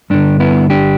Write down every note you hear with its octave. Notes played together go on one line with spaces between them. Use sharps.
G2 D3 D4
B3 E4
D4 G4